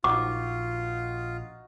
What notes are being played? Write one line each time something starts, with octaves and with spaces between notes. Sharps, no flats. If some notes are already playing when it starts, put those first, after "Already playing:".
A#1 D#4 F4 F#4 D6